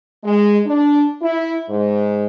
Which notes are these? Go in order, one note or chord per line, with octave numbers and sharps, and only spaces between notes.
G#3
D4
E4
G#2